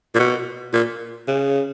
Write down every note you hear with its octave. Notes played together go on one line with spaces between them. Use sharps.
A#2
B2
A#2
C#3